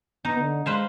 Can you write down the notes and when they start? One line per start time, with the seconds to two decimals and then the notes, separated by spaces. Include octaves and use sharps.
0.25 B3 D#4
0.39 D3
0.66 G#3 B4 C5 F5